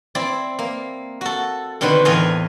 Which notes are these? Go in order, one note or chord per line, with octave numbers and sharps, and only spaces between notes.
C4 E4 D5
A#3
F#4 A4
B2 D3 D#3 C4 B4 B5
E2 A2 B4 D#5 F5 G#5